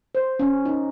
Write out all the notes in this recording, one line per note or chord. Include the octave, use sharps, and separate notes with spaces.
C5
C#4
D#4